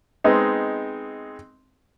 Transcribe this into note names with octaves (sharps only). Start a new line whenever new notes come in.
G#3 B3 C4 D#4